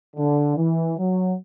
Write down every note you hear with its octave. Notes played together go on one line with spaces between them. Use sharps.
D3
E3
F#3